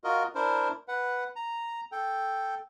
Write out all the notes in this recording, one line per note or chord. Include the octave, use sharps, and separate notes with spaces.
F4 F#4 A#4 D#5
D4 E4 A#4 C5
B4 F#5
A#5
A4 G5